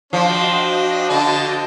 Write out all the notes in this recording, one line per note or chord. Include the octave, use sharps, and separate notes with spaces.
F3 D4 F#4 D#5 G5
D3 A5